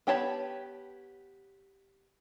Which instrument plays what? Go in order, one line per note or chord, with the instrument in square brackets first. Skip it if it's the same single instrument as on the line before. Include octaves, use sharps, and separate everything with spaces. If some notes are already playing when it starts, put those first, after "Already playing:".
[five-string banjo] B3 G4 C#5 A5 B5